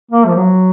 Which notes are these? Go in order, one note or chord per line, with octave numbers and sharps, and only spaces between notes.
A#3
F3
F#3